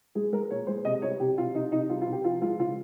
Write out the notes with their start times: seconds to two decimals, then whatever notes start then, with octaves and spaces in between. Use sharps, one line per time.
0.15 G#3 G#4
0.33 G#3 A#4
0.51 A#2 C#5
0.67 G#3 C5
0.85 C3 D#5
1.02 G3 C#5
1.20 C3 G4
1.38 C3 F4
1.54 C3 D#4
1.72 C3 D#4
1.89 G3 F4
2.02 F4
2.06 C3
2.12 G4
2.24 F3 F4
2.42 G#3 F4
2.59 C#3 F4